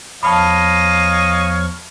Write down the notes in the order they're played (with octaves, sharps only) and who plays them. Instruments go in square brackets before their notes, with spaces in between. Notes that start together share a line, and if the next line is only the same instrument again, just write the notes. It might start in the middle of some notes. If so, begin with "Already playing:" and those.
[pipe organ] E2 F3 F6 [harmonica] C#5 D#5 F5 [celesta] A5 B5